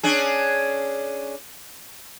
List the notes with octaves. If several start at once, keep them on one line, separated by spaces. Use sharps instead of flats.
C#4 D4 G#4